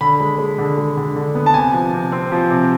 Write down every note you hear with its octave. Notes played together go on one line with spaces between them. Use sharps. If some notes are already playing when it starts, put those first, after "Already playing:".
D3 B5
G#3
G#3
D3
G#3
D3
D3
B3
A5
C3 G#5
F3
C3
C4
F3
C3